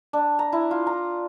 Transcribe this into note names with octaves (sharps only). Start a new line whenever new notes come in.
D4
A#5
E4
F4
A#5